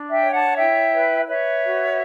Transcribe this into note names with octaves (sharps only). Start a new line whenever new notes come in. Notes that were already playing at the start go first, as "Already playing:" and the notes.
Already playing: D4
E5 G5
C#5
F#5 A5
E4 E5 G5
B4
B4 C#5 E5
F#4